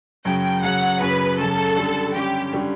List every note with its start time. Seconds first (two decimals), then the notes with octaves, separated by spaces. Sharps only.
0.25 F#2 C#3 F#3 C#4 G5
0.63 F#2 C#3 F#3 C#4 F#5
1.01 F#2 C#3 F#3 C#4 B4
1.38 F#2 C#3 F#3 C#4 A4
1.76 D3 G3 C#4
2.14 D3 G3 C#4 G4
2.52 D3 G3 C#4